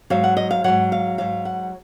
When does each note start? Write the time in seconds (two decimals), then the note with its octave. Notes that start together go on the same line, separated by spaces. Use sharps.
0.10 G#2 F#3 F5
0.24 F#5
0.37 D#5
0.51 F5
0.64 G#2 F#3 F#5
0.92 F5
1.18 G#2 F#3 F5
1.45 F#5